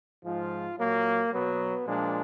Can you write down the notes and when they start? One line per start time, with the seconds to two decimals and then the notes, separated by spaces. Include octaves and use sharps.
0.25 G#2 F3 G#3 F4
0.79 A#2 F#3 A#3
1.32 B2 F#3 B3
1.86 A#2 F3 G#3 D4